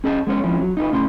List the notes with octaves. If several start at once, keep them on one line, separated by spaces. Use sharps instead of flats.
C#4 G#4 D#5 A5
G#3 B3 C#4 C#5
F2 F3 C#4 E4
F#3
D#4 F4 A4 B4
A2 C#3 C#4 B5 C6